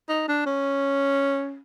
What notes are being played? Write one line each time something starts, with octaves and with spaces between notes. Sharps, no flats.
D#4
D4
C#4